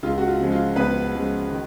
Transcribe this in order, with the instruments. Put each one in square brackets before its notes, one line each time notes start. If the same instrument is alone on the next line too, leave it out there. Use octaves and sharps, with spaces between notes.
[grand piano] C#2 [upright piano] F4
[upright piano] F#4
F4
[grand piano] C#3 F3 G#3
[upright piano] F4
[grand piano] C#2 [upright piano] B3 B4
[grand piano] C#3 F3 G#3
D#3